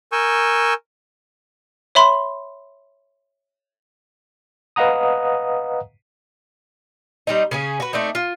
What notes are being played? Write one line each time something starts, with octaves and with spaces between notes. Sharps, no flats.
A#4 G#5 C#6 E6 G6
C#5 E5 B5 C6
B4 D#5 F5 F#5 A#5 D#6
G3 C4 D#4
C#3 C#4 G#4
F#4 B4
A3 C4 D4 D#4
F4